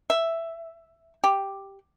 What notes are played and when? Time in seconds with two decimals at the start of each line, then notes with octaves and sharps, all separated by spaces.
0.10 E5
1.24 G4